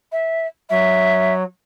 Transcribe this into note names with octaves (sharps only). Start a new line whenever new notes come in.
E5
F#3 E5